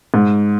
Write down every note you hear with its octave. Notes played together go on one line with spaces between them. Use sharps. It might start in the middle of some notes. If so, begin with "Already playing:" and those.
G#2